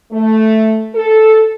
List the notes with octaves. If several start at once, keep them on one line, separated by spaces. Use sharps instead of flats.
A3
A4